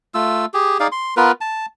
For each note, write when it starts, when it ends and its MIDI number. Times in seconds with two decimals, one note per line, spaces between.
0.14 0.45 57
0.14 0.45 65
0.14 0.45 88
0.54 0.78 67
0.54 0.78 68
0.80 0.87 63
0.80 0.87 68
0.80 0.87 74
0.80 0.87 77
0.92 1.14 84
1.17 1.32 59
1.17 1.32 65
1.17 1.32 70
1.17 1.32 71
1.41 1.66 81